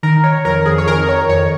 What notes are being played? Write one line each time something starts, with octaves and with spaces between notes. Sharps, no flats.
D#3 A#4
D#3 C#5
F2 A#4
F2 G#4
C#5
D#3 A#4
D#3 C#5
F2 C#5